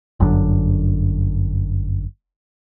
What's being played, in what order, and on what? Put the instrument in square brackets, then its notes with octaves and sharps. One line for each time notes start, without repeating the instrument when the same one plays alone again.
[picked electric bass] G1 F#2 A2 D3